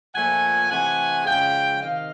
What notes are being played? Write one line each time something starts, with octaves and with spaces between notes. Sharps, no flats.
A#2 F3 A3 F#5 G#5
C3 E3 A3 F#5 G#5
C#3 F3 G#3 F5 G5
C3 D#3 D#5 F5